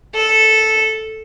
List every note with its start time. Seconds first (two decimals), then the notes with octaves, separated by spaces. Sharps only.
0.14 A4